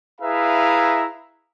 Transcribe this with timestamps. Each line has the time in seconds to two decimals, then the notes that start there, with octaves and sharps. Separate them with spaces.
0.21 E4 G#4 B4 E5 F5 A#5